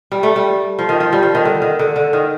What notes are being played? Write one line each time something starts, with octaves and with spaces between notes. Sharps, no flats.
G3
A3
G3
F3
D#3
F3
G3
F3
D#3
D3
D#3
D3
D3
D#3